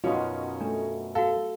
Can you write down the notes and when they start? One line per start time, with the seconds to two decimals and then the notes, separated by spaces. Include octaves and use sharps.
0.04 F#2 B2 C#4 D#4 F4 F#4
0.61 A3 D4
1.15 F#4 A4 F5